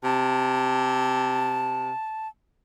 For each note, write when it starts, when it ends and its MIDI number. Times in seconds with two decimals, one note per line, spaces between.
0.04 1.92 48
0.04 2.28 81